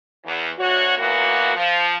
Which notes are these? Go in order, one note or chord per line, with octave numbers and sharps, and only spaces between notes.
E2
D2 F#4 C#5
A#2 E3 F#3 A#3 B3 F#4
F3